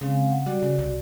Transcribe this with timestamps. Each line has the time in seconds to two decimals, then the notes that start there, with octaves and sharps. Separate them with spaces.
0.01 C#3 G#3 C4 F5
0.30 F#5
0.46 G3 F#4 D5
0.62 C#3
0.78 C2